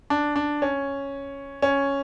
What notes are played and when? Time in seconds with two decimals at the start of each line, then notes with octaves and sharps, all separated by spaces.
0.10 D4
0.36 D4
0.62 C#4
1.62 C#4